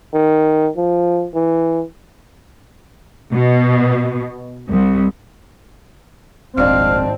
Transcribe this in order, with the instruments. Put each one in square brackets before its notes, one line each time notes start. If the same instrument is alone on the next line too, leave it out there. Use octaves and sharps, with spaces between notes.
[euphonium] D#3
F3
E3
[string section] B2
C2
[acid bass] D#1 [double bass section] G#1 C4 [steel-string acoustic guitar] F2 G#3 D4 [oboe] F5